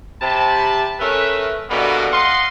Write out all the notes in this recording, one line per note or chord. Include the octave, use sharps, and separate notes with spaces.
C3 A5 B5
A3 C#4 A#4 B4 E5
B2 D3 E3 G3 A#3 B3
D#5 F5 F#5 C6